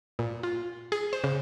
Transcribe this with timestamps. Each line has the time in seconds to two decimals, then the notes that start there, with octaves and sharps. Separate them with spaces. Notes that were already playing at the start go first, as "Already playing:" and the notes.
0.19 A#2
0.43 F4
0.92 G#4
1.13 C5
1.24 C#3